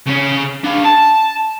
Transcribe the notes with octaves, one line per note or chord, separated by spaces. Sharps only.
C#3 C#4
D4 F5
A5